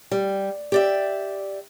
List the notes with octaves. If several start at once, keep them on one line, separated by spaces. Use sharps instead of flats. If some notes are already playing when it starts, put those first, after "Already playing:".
G3
G4 D5 E5